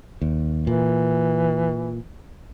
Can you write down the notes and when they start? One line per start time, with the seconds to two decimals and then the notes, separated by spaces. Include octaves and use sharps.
0.21 D#2
0.67 A#2 E3